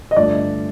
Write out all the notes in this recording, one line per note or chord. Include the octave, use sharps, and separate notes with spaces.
D#5
G2 D3 F3 A3 D5